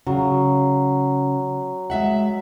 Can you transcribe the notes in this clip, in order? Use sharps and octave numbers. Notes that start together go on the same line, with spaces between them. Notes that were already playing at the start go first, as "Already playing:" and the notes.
C#3 F#3
G#3 E5 F#5